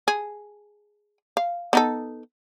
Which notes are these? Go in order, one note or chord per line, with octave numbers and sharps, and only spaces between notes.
G#4
F5
B3 D#4 A4